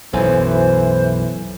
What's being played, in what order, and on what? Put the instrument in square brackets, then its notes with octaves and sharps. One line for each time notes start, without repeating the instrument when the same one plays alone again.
[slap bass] B1 F#2 [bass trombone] E3 [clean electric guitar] A4 C#5 G#5 [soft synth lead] C5